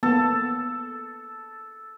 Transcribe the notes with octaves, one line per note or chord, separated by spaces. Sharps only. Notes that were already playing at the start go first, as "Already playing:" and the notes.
A#3 B3 A4